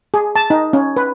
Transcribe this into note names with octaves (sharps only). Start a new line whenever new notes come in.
G#4
A5
D#4
C#4
B4